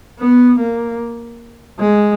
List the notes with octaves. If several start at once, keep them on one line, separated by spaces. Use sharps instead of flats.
B3
A#3
G#3